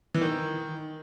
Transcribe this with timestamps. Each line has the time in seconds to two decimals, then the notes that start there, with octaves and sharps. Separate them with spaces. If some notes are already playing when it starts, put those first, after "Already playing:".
0.15 E3
0.21 D#3